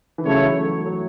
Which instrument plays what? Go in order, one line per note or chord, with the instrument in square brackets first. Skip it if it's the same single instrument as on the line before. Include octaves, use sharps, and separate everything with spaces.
[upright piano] E3
[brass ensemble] C#3 A3 E4 C#5 [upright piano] F#3
[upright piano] E3
A3
F#3
A3
F#3